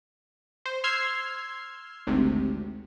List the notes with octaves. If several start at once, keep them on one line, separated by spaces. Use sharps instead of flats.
C5
C6 E6 F6 G#6 C7
G#1 D2 C3